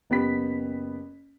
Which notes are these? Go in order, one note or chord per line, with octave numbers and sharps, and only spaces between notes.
F#1 B3 G4 B5 B6